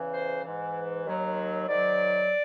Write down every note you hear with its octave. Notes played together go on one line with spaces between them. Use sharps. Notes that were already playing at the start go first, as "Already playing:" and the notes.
Already playing: E2 C#3 E3
C5
G#2 E3
D#2 D#3 F#3
G#2 D#3 F#3 D5